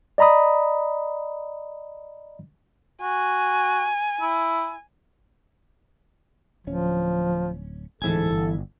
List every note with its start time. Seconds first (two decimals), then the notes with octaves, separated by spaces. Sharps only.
0.18 D5 D#5 A#5 B5 D#6
3.02 F#4 G#5
4.21 E4
6.67 D1 F3 C#4
8.02 D1 G#2 E3 E4 A4 G#5
8.31 G1